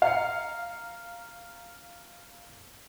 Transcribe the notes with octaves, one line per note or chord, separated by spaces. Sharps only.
F5 A#5 C#7